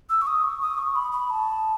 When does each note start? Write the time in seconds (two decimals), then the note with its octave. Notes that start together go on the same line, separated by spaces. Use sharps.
0.10 E6
0.22 C#6
0.27 D#6
0.44 C#6
0.61 D#6
0.78 C#6
0.96 B5
1.12 B5
1.30 A5